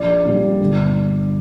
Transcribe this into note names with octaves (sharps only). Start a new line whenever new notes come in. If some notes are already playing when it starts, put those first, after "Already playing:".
Already playing: A#1 D5
A#2 G3
G1